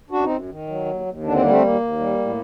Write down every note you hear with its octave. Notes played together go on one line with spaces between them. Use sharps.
F#2 D4 F#4
C4 D#4
F#2
D#3
F#3
D#2
D#2
D3 D4
C4
G3 A#3
A3 C4
D#2 A#3
D#2
G3
A2